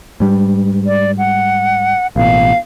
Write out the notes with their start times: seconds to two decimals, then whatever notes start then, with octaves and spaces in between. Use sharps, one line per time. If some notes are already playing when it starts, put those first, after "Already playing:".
0.20 G#2 G3
0.86 D5
1.18 F#5
2.16 A1 B2 F5